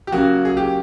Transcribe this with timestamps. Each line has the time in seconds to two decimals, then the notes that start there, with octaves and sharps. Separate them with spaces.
0.07 G4
0.12 C#3 F#3 A#3 F#4
0.45 G#4
0.57 G4